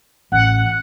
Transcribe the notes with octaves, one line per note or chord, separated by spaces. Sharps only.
A1 F#5